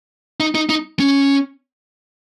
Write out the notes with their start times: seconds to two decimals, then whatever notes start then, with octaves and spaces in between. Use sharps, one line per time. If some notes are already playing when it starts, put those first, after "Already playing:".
0.40 D#4
0.55 D#4
0.69 D#4
1.00 C#4